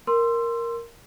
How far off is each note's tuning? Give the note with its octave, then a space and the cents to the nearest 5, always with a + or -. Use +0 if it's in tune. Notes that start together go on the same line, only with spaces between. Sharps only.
A#4 +0 C6 +0 E6 +25